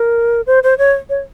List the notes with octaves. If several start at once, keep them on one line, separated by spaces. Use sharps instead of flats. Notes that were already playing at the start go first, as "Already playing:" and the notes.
Already playing: A#4
C5
C5
C#5
C#5